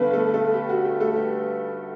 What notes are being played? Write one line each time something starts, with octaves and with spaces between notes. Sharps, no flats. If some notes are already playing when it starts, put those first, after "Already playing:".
Already playing: G1 G2 D3 B3 B4
A3 A4
A3 A4
G4
F#4
G4
A3 A4
G4